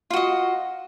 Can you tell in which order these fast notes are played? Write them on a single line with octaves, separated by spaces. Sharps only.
F4 F#4 D#5